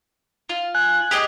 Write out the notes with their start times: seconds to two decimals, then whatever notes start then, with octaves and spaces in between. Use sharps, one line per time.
0.49 F4
0.75 G#5 F#6
1.11 G4 G#4 D#5